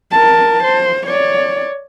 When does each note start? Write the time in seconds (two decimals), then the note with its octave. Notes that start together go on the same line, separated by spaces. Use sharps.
0.11 A#4 A5
0.63 C5
1.06 C#5 D5